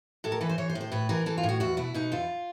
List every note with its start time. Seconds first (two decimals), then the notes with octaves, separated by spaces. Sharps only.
0.24 A2 A4
0.32 A#4
0.41 E3 B4
0.49 C5
0.58 E3 C#5
0.69 C5
0.75 A2
0.81 C5
0.92 A2 B4
1.09 E3 A#4
1.26 E3 A4
1.38 F4
1.43 A2
1.49 F#4
1.60 E2 F#4
1.77 B2 E4
1.94 B2 D#4
2.12 E2 F4